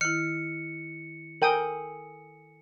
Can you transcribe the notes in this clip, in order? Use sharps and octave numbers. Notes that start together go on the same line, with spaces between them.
D#3 E4 F6 C#7
A4 A#4 G5 G#5 D#6